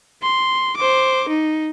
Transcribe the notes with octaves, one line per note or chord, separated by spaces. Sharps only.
C6
C5 D6
D#4